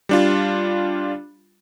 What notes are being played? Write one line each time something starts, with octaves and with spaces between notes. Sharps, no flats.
G3 D4 F4